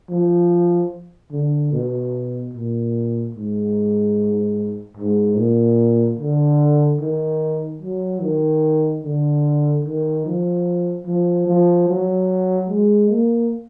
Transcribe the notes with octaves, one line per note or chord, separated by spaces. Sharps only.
F3
D3
B2
A#2
G#2
G#2
A#2
D3
D#3
F#3
D#3
D3
D#3
F3
F3
F3
F#3
G#3
A#3